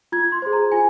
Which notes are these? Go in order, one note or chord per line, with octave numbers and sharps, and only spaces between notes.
F4 G#6
C6
G#4 C5
A#5
F4 G#5